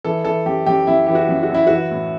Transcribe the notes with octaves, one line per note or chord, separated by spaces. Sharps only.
E3 A4
E3 A4
F#2 G4
F#2 G4
F#2 E4
E3 G4
F#4
F#2
F#4
F#2
E4
E3 F#4
A2